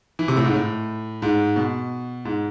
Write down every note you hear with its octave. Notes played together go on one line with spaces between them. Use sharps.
E3
C3
A2
G#2
A2
G#2
B2
G#2